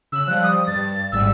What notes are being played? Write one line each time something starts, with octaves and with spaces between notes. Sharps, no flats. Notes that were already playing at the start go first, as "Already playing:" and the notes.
C#3 E6 F#6
F3 G3 F#6
D#6
G2 A6
G#1 G#2 G3 E6